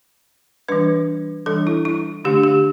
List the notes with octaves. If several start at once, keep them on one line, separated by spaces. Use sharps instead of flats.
E3 G3 D4 B4
E3 G3 D4 A4
E4
E4
D3 A3 D4 G4
G4